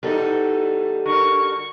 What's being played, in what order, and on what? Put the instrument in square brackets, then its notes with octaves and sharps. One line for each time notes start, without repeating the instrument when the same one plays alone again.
[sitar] E2 D#4 [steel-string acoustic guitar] G3 F#4 A4
[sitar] D3 A#4 [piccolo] C#6